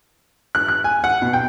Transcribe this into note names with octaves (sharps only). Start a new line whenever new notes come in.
F#6
F#6
G#5
F#5
B2
G5